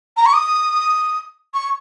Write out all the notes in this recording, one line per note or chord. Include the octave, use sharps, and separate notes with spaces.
A#5
C#6
D#6
C#6